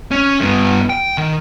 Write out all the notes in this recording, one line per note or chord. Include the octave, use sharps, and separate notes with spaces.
C#4
G2 B3
G5
D#3